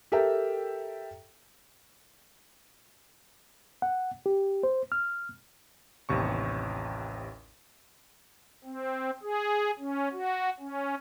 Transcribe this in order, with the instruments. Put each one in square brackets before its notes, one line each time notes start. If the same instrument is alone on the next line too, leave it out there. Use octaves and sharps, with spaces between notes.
[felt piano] G4 A4 A#4 E5 G5
[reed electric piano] F#5
G4
C5
F6
[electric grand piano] A1 D#2 C3 C#6
[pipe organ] C4
G#4
C#4
F#4
C#4